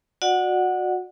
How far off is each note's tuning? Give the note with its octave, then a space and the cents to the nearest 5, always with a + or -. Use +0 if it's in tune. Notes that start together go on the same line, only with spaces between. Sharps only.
F#4 -25 D5 +25 F#5 +0